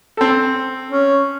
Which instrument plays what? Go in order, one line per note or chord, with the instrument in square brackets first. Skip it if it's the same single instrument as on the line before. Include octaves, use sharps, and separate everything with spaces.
[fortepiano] C4 A4
[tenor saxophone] C#4